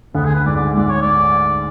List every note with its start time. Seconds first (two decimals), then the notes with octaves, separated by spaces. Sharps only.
0.15 D2 D3 B3
0.25 G#4
0.35 B4
0.46 G#2 G#3 D5
0.56 G#2 G#3 D5
0.77 G#2 G#3 D5
0.90 C#5
1.02 D5